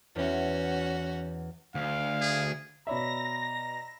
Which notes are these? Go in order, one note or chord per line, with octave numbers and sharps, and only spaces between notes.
E2 C#4 F#4
D2 F5
G#4
B2 C#5 D5 E5 A#5 B5 A#6